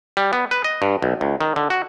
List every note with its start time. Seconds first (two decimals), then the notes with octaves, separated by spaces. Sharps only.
0.17 G3
0.33 B3
0.51 B4
0.64 D#5
0.82 G2
1.02 B1
1.21 C#2
1.41 D#3
1.56 D3
1.70 F#4